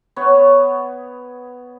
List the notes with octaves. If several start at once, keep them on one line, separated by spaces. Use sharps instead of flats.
B3 C#5